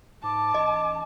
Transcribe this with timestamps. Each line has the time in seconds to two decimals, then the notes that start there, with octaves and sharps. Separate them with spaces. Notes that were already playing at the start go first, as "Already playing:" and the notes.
0.23 G#2 A5 D6
0.54 A1 D#5